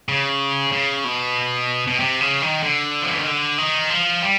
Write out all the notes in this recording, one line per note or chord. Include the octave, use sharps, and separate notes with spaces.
C#3
C#3
B2
B2
C3
C#3
D#3
D3
F3
E3
D#3
D3
D#3
F3
G3